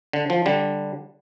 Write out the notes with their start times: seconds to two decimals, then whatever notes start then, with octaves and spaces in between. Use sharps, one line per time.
0.13 D3
0.30 F3
0.46 D3 G3